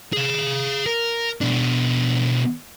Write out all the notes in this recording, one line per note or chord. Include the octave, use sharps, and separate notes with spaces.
G#4 F5
A#4
B2 D4